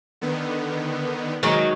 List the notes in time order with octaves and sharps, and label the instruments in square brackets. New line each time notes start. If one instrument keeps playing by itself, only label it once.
[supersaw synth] D3 D#3 B3
[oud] D#3 F#3 G#3